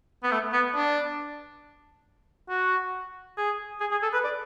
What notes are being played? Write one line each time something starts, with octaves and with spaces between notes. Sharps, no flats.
B3
A3
B3
D4
F#4
G#4
G#4
G#4
A4
B4
D5